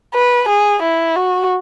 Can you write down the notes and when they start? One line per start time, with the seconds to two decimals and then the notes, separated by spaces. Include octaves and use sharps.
0.14 B4
0.48 G#4
0.83 E4
1.16 F#4